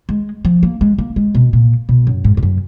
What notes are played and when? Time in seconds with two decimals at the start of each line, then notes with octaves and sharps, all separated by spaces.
0.09 G#3
0.45 F3
0.63 A#3
0.81 G#3
0.98 A#3
1.16 G#3
1.35 B2
1.53 A#2
1.89 B2
2.07 F#2
2.24 G#2
2.37 G#2
2.43 F#2